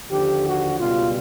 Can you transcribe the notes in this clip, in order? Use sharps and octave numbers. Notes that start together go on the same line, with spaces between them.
D#2 D3 F3 G4
F#4
C#2 B2 G3 F4